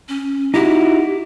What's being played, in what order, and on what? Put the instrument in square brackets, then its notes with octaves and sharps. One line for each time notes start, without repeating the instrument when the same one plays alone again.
[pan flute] C#4
[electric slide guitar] D#4 E4 F#4 [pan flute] G4